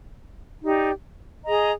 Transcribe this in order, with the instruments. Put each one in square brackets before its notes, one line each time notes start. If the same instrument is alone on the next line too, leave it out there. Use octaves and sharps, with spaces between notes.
[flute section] D#4 G4 D5
G#4 D#5 A#5